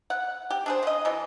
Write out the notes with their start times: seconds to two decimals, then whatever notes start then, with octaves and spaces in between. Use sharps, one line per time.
0.10 F#5
0.50 G4
0.66 D4 G#4 C5
0.83 C#3 D#5
1.05 B2 E3